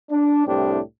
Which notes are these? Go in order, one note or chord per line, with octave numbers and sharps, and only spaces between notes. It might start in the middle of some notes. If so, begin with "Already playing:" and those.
D4
C2 A2 C4 D4 G4